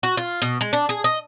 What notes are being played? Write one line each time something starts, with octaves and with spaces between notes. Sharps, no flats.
F#4
F4
B2
G#3
D4
G#4
D#5